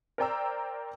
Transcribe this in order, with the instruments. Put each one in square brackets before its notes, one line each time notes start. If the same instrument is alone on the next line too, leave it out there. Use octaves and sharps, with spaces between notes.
[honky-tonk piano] A#4 C5 D5 G5 A#5 E6